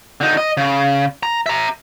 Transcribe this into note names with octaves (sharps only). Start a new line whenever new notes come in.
D3 D#4
D#5
C#3
A#5
E5 A#5